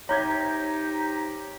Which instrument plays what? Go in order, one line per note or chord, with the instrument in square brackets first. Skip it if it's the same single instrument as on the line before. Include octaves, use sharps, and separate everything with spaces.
[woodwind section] C3 D#4 G4 [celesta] C#5 [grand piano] A#5 G6 G#6